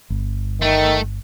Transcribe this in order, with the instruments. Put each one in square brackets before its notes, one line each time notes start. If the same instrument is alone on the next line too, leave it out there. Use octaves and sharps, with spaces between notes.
[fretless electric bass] G1
[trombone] D#3 [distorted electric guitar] A3